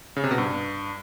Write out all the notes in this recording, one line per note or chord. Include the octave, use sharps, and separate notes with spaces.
C#3
C3
B2
G2